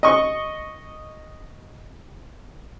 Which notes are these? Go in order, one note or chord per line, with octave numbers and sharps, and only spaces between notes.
D#5 C#6